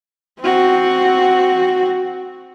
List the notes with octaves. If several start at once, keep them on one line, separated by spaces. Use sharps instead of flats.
C4 F#4